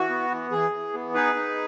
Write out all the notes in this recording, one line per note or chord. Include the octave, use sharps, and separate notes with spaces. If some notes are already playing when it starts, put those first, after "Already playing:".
Already playing: E3 F#4
B3
E3
E3 G#4
E3
B3
D#4 G#4 B4
D#4